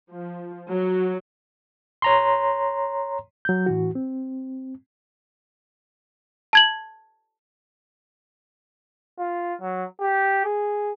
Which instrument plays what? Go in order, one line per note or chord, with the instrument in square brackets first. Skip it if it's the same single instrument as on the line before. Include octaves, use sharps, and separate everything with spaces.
[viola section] F3
F#3
[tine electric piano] C#5 A#5 C6
[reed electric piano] F#3 G6
A2 E3 F#4
C4
[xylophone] A5 G#6 F#7
[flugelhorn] F4
F#3
G4
G#4